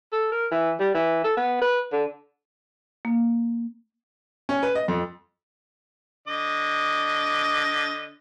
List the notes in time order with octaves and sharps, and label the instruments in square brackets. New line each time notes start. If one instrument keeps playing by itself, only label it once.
[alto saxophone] A4
A#4
E3
G3
E3
A4
B3
B4
D3
[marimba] A#3
[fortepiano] C#4
B4
D#5
F2
[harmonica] D3 D#5 D6